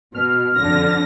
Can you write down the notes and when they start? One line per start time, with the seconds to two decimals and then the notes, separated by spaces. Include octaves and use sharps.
0.14 B2 F6
0.59 F2 D3 A#6